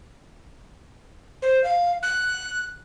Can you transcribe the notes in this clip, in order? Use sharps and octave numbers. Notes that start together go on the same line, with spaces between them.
C5
F5
F#6